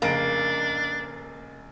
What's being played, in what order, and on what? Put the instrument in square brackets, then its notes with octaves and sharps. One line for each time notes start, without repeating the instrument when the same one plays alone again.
[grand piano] F1 C#3 D7 [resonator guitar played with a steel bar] A#3 [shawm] D4